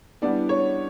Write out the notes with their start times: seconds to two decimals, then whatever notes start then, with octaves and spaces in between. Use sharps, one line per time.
0.22 E3 G3 B3 D4 D5
0.49 C#5